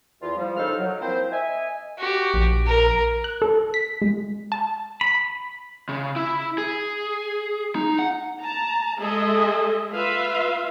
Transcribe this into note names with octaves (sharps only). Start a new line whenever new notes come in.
E2 F4
F3 G3
C2 C#3 D#4 A4 C5 F6
F#3
F3 A#3 C4 E4 C5
D#5 E5 G#5
F#4 G4
A#1
A#4
F#6
A4
B6
G#3
A5
B5
C#3
E4
G#4
D#4
F#5
A5 A#5
G#3 G#4 A4 D#5 E5
F4 B4 E5 F5